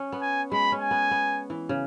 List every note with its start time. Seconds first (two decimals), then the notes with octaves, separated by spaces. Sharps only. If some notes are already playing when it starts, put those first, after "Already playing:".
Already playing: C#4
0.12 B3
0.22 G#5
0.52 G#3 B5
0.72 C#4
0.81 G#5
0.91 B3
1.11 B3
1.50 E3
1.69 C#3